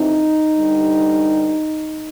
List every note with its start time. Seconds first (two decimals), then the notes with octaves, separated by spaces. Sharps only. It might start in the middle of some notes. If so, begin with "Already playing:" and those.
Already playing: F2 C3 E3 D#4
0.55 G2 D3 G3